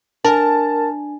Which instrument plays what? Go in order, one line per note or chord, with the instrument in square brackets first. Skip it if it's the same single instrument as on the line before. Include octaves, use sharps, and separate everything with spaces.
[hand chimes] D4 G#5 [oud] A#4 [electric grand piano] A5